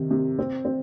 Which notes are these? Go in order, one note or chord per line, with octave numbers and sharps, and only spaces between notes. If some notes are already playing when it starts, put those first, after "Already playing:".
Already playing: C3 D#3
C3
C4
C4